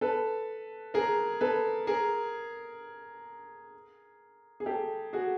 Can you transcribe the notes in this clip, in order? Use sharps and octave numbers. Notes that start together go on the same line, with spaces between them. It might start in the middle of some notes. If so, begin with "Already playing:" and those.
A4 B4
G#4 A#4
A4 B4
G#4 A#4
G#4
G4 A4
F#4 G#4